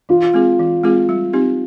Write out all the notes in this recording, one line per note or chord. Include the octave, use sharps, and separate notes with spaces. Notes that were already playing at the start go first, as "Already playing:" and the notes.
E3 F4
G#3 C4 F4 G#4
E3
G#3 C4 F4 G#4
G3
C4 D#4 G4